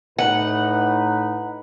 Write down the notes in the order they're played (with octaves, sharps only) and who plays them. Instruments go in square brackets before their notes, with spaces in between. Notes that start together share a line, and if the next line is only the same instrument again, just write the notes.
[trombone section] A2 D#4 B4 [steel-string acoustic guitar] F#5